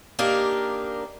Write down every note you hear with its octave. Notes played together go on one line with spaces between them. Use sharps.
A#3 D4 D#4 G4 A#4